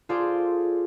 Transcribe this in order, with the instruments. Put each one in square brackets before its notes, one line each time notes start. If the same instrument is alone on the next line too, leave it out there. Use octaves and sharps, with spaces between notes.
[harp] F4 G#4 A4 C5 D5